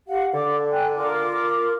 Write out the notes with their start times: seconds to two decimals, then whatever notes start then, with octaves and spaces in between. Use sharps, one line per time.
0.08 G4 F5 F#5
0.34 D3 D5 D6
0.71 G5 G#5 F#6
0.96 F4 A#4 D6